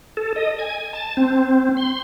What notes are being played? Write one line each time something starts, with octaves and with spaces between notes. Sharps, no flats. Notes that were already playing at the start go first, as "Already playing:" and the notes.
A4
D#5
G#5
A5
C4
C6